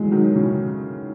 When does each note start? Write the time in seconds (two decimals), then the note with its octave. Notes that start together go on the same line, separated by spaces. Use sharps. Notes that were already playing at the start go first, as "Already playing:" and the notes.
Already playing: E3 F#3 G#3 A3
0.11 D#3 F#3
0.35 C#3 E3